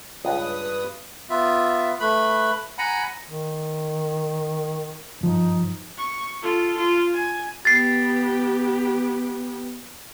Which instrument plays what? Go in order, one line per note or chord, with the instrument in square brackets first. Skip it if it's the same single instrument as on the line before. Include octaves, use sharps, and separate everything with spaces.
[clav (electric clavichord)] C#2 [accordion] G2 B4 D#6
[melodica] B3 F4 E5
A3 B4 B5
F#5 G#5 A#5 B5
[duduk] D#3
[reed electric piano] G2 F3 [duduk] D#4
[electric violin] C#6
F4 A4
F4
G#5
[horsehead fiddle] B3 G4 [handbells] A6 C7